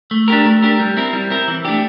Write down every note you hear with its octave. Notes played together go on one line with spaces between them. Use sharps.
A3
D4 G4 A#4
A3
D4 G4 A#4
G3
C4 E4 A#4
G3
C4 E4 A#4
E3
A3 D4 G4